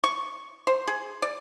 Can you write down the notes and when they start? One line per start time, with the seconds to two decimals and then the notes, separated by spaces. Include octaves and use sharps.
0.04 C#6
0.67 C5
0.87 G#4
1.22 D5